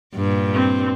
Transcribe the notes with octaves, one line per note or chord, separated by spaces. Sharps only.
G2 A#2
C4